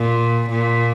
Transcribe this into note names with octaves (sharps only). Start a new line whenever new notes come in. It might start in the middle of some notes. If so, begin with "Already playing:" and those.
Already playing: A#2
A#2